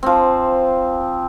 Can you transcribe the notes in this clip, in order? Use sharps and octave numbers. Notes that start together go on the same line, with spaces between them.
F3 C4